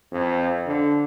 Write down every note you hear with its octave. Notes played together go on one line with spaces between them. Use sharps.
F2
D3